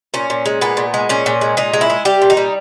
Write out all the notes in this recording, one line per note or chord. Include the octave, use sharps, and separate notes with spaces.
A#2 C#4
A#2
G#3
A#2 B3
A#2
G#3
A#2 C#4
A#2
G#3
A#2 D#4
G#3
E4
G#3
G3 G4
A#2
D#4
G3